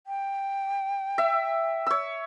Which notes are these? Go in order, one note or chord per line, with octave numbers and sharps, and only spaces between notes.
G5
E5
C#5 E6